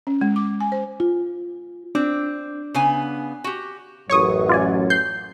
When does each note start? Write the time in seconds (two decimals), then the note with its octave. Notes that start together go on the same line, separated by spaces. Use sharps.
0.07 C#4
0.21 G#3
0.36 D6
0.60 G#5
0.72 C5
1.00 F4
1.95 C4 D4
2.74 C#3 B3 G#5
3.44 F#4 G4
4.10 A1 F#2 F#3 C#5 C#6 D#6
4.49 F4 D5 G#5
4.90 G6 C7